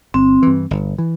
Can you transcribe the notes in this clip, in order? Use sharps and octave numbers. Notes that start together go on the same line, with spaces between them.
G1 C4
G2 E3
G1
E3